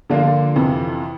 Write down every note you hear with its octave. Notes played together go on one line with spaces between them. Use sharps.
D3 F3 A#3 D4 F4
F2 C3 E3